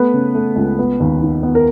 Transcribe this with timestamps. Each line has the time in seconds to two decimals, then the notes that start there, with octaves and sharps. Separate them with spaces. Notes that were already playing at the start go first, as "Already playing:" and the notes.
Already playing: A3 B3 B4
0.14 C#3
0.34 A3
0.56 C#2
0.79 B3
1.00 D#2
1.22 D#3
1.43 B3
1.55 A#4